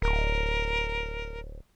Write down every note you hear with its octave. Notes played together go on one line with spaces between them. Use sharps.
D1 A#4